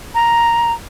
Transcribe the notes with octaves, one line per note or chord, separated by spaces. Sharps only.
A#5